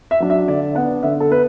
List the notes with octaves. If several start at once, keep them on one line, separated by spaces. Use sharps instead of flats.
E5
F#3 D4
E5
D3 D5
B3 D4 F#5
D3 E5
A4
B3 B4